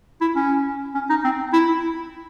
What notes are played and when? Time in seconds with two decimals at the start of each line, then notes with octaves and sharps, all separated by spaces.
0.21 E4
0.36 C#4
0.95 C#4
1.10 D#4
1.24 C4
1.53 E4